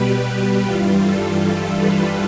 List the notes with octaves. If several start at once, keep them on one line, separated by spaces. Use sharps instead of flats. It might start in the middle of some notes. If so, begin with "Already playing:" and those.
Already playing: B2 G3 G4 B4
G2 E3 G3 F4
A4
B4